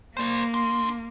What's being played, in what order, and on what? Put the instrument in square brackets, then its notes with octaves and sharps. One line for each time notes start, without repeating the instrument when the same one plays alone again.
[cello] A#3 [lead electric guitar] C5 D5
[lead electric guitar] D4 C6